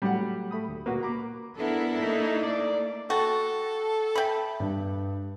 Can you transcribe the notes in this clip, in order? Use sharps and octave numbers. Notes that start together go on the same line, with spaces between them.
A2 F#3 G3 A3 F#5
A3 B5 D#6
D2
A#2 A#3 F#4 B4
A#5 B5 D6
B3 D4 E4 A4 A#4
A#3 D#4
D5
F#4 A4 G5 A6
E5 G5 B5
G2